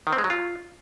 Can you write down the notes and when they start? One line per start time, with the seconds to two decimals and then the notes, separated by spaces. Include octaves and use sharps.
0.07 D#3
0.13 C4
0.18 G#3
0.24 F#3
0.30 F4